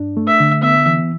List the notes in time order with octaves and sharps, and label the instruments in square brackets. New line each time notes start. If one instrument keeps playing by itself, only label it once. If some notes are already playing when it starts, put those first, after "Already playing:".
Already playing: [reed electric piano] G2 D4
A3
[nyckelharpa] E5
[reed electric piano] D3
[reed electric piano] B3 [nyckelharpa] E5
[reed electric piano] E3